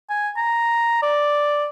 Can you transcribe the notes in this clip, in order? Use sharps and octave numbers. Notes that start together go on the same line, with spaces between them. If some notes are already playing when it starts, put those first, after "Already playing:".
G#5
A#5
D5